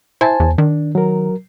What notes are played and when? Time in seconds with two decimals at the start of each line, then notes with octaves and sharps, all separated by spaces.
0.21 E4 C5 G#5 A5
0.40 E2
0.58 D#3 D4
0.95 F#3 A#4